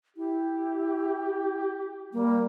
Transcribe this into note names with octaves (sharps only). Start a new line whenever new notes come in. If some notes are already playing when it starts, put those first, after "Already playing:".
E4 G4
G3 A#3